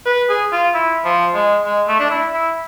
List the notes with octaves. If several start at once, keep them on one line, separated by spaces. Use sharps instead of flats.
B4
G#4
F4
E4
F3
G#3
G#3
A3
D4
E4
E4